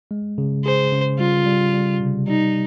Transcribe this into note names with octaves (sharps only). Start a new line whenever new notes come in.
G#3
C#3
G#4 C5
C#3
G3 F4
G3
G3
C3
G3 D#4